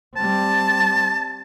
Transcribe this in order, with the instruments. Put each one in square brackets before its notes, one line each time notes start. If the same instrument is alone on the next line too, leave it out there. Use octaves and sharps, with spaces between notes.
[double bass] G3 C4 [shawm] A5